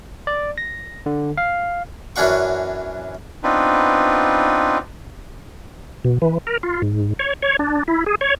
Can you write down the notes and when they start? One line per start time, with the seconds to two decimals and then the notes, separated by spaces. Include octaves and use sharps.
0.27 D5
0.58 A#6
1.06 D3
1.37 F5
2.16 F#2 E3 C#4 D4 F#5 C#6
3.43 B3 C4 D4 D#4 F4 B4
6.05 B2
6.22 E3
6.47 A#4
6.63 F4
6.82 G#2
7.19 C#5
7.42 C#5
7.59 D4
7.88 E4
8.06 G#4
8.21 C#5